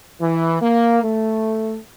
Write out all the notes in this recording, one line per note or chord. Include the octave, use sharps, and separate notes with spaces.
E3
A#3
A3